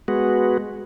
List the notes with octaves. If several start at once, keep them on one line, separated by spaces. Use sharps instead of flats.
G#3 B3 F#4